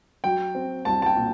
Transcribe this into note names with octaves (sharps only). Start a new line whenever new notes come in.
F#3 G5
C4
C2 A5
A5
G5
A#2